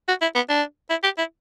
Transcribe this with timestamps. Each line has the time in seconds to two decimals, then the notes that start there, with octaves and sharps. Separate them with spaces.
0.08 F#4
0.22 E4
0.35 B3
0.50 D4
0.90 E4
1.03 G4
1.18 E4